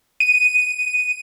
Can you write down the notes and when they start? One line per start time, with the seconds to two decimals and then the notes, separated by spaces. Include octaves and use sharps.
0.20 D#7